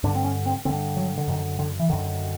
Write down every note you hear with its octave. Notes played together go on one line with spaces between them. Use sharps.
G2 D3 D4
C4
C#4
C4
G2 D3 C4
F#3
D3
F#2 D3 D#3
D3
E3
F#2 D3 D#3